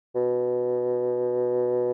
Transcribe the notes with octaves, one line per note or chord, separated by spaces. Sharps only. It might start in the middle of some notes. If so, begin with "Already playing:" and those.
B2